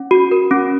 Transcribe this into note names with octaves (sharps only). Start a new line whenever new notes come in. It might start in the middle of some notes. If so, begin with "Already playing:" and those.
Already playing: C#4
F#4
A#4
C#4